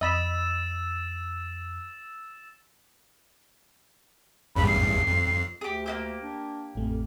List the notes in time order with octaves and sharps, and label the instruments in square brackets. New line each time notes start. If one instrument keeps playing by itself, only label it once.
[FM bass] F2 [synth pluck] D#5 B5 [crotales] E6 A6 E7
[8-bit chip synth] A1 E2 G2 [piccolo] B5
[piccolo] C7
[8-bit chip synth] F2
[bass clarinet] D2 [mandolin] G4 G#4
[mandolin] A#3 E4 G4
[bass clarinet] D4
[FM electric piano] A1 A3 [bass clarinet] F2